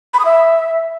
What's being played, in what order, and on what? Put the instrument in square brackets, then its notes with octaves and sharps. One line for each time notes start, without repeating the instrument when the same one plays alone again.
[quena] B5
D#6
E5